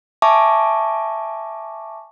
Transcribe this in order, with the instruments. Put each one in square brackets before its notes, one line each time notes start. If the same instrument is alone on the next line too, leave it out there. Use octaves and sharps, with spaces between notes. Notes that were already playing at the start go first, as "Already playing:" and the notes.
[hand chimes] E5 G#5 A5 C#6 D6